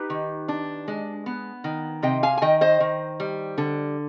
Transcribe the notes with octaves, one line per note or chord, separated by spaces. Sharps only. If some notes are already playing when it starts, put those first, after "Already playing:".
Already playing: D#4 G4 B4
D#3
D4
G#3
B3
D#3
C3 D#5 G5
F5 G#5
G#5
D#3 D#5 G5
C5 D#5
D#3
G3
D3